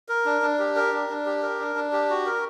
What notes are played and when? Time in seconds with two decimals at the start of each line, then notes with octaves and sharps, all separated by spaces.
0.09 A#4
0.25 D4
0.42 D4
0.59 G4
0.76 A#4
0.92 D4
1.09 D4
1.26 G4
1.42 A#4
1.59 D4
1.76 D4
1.93 G4
2.10 F#4
2.26 A#4